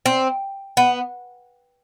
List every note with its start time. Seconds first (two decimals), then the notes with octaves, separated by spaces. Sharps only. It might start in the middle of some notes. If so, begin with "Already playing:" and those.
0.06 C4
0.77 B3